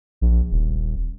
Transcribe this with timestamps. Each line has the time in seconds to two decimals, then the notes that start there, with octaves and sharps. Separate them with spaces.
0.21 A#1
0.51 D#1